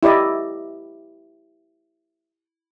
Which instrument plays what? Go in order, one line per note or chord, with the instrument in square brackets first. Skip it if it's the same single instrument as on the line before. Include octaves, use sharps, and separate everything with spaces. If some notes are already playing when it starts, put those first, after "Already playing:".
[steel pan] E4 G4 D5 D#5